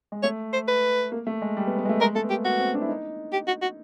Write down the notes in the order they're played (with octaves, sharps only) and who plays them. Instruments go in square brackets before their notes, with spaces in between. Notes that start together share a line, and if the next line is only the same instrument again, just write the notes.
[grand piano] G#3
[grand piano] A3 [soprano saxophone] C#5
[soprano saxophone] C5
B4
[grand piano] A#3
A3
G#3
G3
B3
B3
G#3
A3
[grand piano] G#3 [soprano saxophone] A#4
[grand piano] A3 [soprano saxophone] A4
[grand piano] B3
[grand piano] A#3 [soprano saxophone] G4
[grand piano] B3 [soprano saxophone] F#4
[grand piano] C4
D4
E4
D#4
[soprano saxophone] G4
F#4
F#4